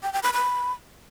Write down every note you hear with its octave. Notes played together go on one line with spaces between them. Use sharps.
G5
G5
B5
B5